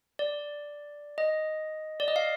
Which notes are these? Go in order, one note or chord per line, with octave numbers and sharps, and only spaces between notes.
D5
D#5
D5
D#5
F5